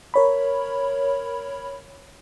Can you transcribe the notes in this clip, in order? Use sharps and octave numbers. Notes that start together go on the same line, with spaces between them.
A#4 C#5 B5